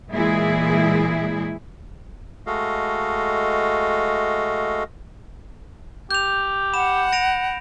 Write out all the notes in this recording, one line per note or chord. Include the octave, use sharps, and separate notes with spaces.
A#2 E3 G#3 E4 G#4
G#3 A3 F#4 A4 D#5 F5
G4 G6 F7
F#5 B5 E7
A#6 D7 F7